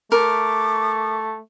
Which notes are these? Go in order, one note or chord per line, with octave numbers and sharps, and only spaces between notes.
A3 A#4 D6